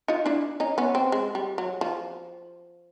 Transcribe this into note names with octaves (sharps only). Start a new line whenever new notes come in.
D#4 F4
D4 E4
C#4 D#4
B3 C#4
C4
G#3
G3
F#3
F3